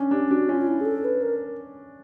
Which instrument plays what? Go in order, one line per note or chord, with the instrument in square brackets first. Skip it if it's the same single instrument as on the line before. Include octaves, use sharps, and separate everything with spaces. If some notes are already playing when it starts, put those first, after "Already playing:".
Already playing: [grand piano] C#4 D4
[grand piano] D4 [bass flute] G4
[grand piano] D4 [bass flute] F#4
[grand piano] C#4 [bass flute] F4
[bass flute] F4
E4
G#4
A4
B4
A#4